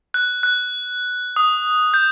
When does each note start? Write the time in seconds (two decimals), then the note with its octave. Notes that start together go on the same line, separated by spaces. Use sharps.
0.14 F#6
0.43 F#6
1.36 D#6
1.94 G6